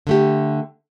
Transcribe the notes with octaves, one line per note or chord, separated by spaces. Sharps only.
D3 A3 G4